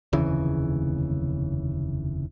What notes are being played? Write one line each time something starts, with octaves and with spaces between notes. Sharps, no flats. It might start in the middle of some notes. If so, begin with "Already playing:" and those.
F1 D#2 C#3 E3